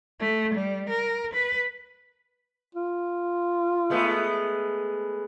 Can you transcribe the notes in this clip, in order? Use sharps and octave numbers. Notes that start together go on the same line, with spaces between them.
A3
G3
A#4
B4
F4
G#3 A3 B3